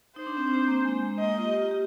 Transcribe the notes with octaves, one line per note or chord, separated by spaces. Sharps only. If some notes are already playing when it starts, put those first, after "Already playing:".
D#4 C5
D4
C4
D4
C4
A#3
G#3
G#3
A#3 D#5
F4
G4
F4
G4